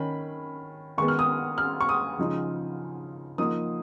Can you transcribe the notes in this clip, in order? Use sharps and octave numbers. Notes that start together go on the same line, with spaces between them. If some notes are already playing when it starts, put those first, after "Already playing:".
Already playing: D#3 C#4 B5
D#3 G#3 B3 C#6
F6
D#6
F6
C#6
D#6
C#3 F3 G#3 D#4
F3 A#3 D#4 D#6